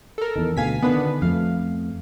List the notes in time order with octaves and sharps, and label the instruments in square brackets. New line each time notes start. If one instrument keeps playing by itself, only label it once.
[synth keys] A4 A#4
[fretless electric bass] E2 D#3
[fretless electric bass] D2 B2 [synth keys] F5 G#5 B6
[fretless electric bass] D3 D#3 [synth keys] B3 D4 B4
[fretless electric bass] F2 F3 A3 [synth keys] F5